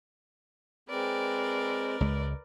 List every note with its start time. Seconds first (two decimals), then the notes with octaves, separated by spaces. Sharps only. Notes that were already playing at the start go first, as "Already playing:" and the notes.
0.89 G#3 C4 A#4 B4 D5
2.00 C#2 G#3